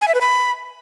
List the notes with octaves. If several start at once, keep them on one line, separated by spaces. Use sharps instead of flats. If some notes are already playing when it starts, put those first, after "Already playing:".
G#5
E5
B4
B5